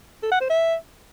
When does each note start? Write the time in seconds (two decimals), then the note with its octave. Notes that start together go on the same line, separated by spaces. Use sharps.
0.23 A4
0.32 F#5
0.41 C5
0.50 E5